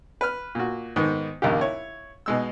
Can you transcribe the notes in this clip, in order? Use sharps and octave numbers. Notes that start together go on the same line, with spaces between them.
B4 F6
A#2 F#4
G#2 D#3 B3
A#1 D#2 C#3 A#3 G4
E4 C#5
B2 G#3 E6